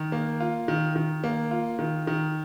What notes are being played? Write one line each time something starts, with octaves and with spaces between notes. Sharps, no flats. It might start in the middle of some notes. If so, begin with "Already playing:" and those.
Already playing: D#3
A#3
F4
D#3
D#3
A#3
F4
D#3
D#3